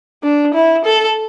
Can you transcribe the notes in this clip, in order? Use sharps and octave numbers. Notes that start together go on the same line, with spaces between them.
D4
E4
A4